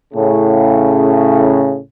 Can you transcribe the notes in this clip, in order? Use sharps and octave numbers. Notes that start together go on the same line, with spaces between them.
A2 C#3